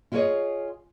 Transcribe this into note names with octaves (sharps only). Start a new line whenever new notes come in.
E4 F4 G#4 B4 C#5 D#5